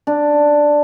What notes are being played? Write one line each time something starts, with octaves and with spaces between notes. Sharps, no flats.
D4